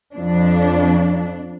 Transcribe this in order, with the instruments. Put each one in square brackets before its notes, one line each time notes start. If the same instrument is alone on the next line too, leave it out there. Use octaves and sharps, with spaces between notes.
[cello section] F2 D4